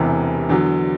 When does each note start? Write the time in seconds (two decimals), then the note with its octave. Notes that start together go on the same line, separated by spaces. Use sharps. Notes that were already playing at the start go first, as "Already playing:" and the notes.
Already playing: E1 E2 C3 E3
0.49 E2 D3 F#3